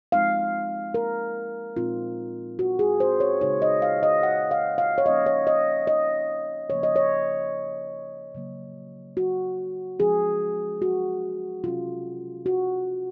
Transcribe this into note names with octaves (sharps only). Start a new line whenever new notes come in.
F3 G#3 C4 D#4 F5
A#4
A#2 G#3 C4 D#4 F4
F#4
G#4
C5
C#5
C#3 G#3 D#4 C#5
D#5
F5
D#5
F#5
F5
F5
C#5
F3 A#3 C#4 D#5
C#5
D#5
D#5
C#3 F3 A#3 C#5
D#5
C#5
C#3 F#3 A#3
F#4
F3 G#3 C#4 G#4
F#4
C3 F#3 C#4 F4
F#4